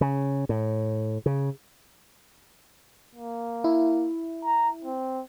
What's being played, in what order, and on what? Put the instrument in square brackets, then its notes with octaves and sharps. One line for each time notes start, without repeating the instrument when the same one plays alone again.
[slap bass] C#3
A2
C#3
[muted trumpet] A#3
[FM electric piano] E4
[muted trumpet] A#5
C4